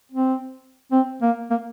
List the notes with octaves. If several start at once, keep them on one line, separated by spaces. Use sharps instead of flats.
C4
C4
A#3
A#3